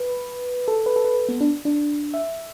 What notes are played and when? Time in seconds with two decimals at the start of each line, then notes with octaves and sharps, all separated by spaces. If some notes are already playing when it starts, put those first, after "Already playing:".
Already playing: B4
0.68 A4
0.86 B4
0.96 A4
1.04 B4
1.29 B3
1.41 D4
1.65 D4
2.14 E5